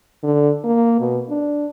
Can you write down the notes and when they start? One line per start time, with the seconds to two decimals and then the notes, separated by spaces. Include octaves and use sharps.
0.23 D3
0.64 A#3
1.00 B2
1.30 D4